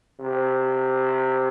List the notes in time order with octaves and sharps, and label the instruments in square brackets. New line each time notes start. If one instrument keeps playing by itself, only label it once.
[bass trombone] C3